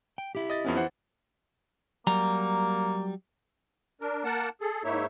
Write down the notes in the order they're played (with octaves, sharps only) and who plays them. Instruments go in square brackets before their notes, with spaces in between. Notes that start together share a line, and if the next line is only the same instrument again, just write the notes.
[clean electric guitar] G5
E4 G4
[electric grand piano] D#5 A6
F2 B3 C#4
E3 C5 F#5
[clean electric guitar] F#3 G3 A#5 [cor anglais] A#3
[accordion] D4 A#4
A#3 A#4 F#5 A5
G#4 A4
G#2 A#3 D#4 E4 C#5 E5